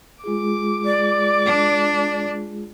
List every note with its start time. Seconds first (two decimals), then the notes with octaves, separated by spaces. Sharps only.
0.24 G#3 F4 G#4 D6
0.85 D5
1.46 D4